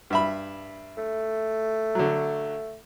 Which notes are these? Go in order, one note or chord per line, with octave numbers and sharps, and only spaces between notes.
G2 E5 B5
A3
D3 F#3